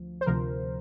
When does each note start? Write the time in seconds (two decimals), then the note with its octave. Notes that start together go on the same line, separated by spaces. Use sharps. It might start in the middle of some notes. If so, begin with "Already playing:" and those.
Already playing: D2 F3
0.21 C5
0.26 D2 C3 F3 A#4